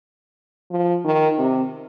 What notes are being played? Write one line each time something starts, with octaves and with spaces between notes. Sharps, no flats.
F3
D#3
C3